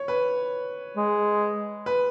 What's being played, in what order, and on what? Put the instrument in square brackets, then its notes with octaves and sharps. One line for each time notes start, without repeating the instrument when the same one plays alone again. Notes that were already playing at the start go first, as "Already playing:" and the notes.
Already playing: [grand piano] C#5
B4
[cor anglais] G#3
[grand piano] B4